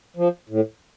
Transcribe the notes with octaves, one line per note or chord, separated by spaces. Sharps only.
F3
A2